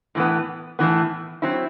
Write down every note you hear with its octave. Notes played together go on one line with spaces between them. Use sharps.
A2 E3 B3
A2 E3 B3
F#3 C4 E4